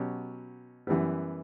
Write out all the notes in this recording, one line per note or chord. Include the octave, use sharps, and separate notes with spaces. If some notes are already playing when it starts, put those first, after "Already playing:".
Already playing: B2 F#3 C#4 G4
F#2 E3 G3 B3